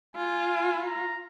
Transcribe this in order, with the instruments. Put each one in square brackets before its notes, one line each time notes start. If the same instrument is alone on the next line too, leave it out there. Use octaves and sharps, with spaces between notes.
[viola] F4 [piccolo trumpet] G#5
[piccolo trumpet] A#5